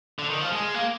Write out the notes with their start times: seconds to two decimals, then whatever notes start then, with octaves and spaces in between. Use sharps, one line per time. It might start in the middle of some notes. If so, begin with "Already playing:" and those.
0.19 D3
0.30 D#3
0.41 F3
0.52 G#3
0.74 A#3